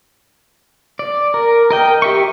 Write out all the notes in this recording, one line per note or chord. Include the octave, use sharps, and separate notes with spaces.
D5
A#4
A#4 D#5 G5
G4 E5 C#6